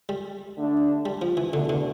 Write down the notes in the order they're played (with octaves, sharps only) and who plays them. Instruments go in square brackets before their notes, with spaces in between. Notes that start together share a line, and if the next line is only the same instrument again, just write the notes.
[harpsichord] G3
[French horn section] D3 A3 D4
[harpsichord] G3
F3
E3
[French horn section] E2 B2 A3 D4 [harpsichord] D3
[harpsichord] D3